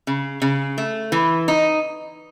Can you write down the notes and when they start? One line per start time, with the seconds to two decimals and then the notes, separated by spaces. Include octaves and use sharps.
0.07 C#3
0.42 C#3
0.78 A3
1.12 E3
1.48 D#4